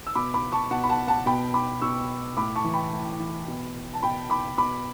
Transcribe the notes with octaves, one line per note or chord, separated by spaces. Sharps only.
E6
B2 B5 D6
B5 D6
A5 C#6
B2 F#5 A5
B5
F#5 A5
F#5 A5
B2 G5 B5
B5 D6
B2 C#6 E6
A2 B5 D6
A5 C#6
E3
G5 B5
A2
E3
B2
A5
B2 G5 B5
B5 D6
B2 B5 D6